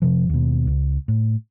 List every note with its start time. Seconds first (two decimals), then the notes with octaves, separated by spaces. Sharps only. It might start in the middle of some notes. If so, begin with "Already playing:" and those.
0.02 F1 C3 F3
0.29 D#2 B2
0.67 C#2
1.08 A2